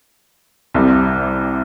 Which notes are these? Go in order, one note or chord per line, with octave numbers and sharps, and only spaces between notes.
C2 C3 G3